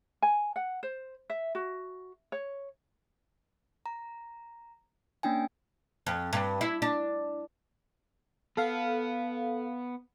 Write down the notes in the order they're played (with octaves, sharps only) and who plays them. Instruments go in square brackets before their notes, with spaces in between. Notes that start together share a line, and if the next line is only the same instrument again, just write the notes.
[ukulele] G#5
F#5
C5
E5
F#4
C#5
[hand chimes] A#5
A#3 C#4 D4 G5 G#5
[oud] F2
G2
E4
D4
[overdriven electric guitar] B3 [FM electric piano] A4 F5